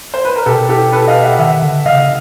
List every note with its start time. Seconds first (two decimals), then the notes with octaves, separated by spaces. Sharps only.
0.14 C5
0.25 B4
0.36 A#4
0.46 B2 G4 A4
0.69 G4 A4
0.92 A4 B4
1.07 D#5 F5
1.23 E5 F#5
1.39 D#3 E5 F#5
1.62 D3
1.86 C#3 D#5 F5